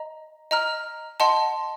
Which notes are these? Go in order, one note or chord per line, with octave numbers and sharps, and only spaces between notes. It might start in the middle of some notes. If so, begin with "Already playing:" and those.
Already playing: D#5 A#5
D#5 A#5 F6
D#5 F#5 A5 C6